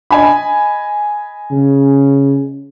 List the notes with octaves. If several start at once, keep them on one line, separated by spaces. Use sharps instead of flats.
D#5 G#5 B5
C#3